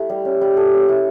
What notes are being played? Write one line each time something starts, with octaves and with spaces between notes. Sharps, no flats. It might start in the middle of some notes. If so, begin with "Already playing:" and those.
Already playing: A3 E4 G4
G3
C#4
G3
A4
C#4
E4